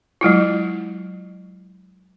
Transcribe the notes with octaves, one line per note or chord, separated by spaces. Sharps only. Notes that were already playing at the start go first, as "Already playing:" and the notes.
F#3 G#3 E4 F4